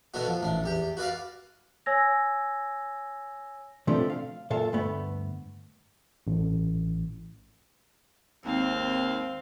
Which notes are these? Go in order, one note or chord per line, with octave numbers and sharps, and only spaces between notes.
B2 D3 B3 D4 F#4
F3
A1 D4
E2 G4
F#4 B4 D5 F5
C#5 G#5 E6 G#6 A#6
B2 F3 A3 C4 D4 G4
F5
B1 A#2 A4 E5 F5
D2 G2 A3 B3
A1
G#1 D#2 C4 F5